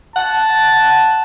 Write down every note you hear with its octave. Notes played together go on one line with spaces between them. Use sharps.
F#5 A5